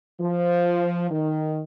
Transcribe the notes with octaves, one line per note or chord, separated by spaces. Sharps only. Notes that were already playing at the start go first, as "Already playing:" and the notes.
F3
D#3